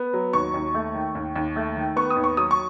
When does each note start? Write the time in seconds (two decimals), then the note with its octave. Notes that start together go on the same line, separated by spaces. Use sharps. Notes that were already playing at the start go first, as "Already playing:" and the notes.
Already playing: B3
0.13 F#3
0.33 D#2 C#6
0.54 D#2
0.74 A3
0.95 D#3
1.15 D#2
1.36 D#2
1.56 A3
1.77 D#3
1.96 B3 C#6
2.10 D#6
2.17 D#2
2.24 C#6
2.37 F#3 D#6
2.51 C#6